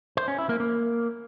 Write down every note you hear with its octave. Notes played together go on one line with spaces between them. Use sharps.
C5
C#4
E4
A#3
A#3